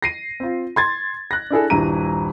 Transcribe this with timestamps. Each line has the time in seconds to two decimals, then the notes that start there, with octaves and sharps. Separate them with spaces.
0.03 A#6 C7 D#7
0.40 C4 F4
0.76 C6 G#6 A6
1.31 F#6 A#6
1.50 D4 E4 G#4 A4
1.70 D#1 G2 E4 A#5 D#7